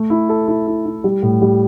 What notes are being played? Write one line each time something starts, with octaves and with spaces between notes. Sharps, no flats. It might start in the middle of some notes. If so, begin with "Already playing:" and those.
Already playing: A3
E4
A4
E4
E4
E4
G3
A2
G3